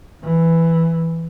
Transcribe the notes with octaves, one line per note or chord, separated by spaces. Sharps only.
E3